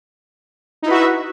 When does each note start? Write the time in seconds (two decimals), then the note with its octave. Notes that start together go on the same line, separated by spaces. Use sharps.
0.82 D#4
0.85 E4
0.88 B4
0.90 F#4
0.93 E5